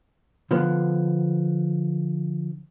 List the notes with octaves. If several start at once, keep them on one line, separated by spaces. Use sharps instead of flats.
D3 F3 B3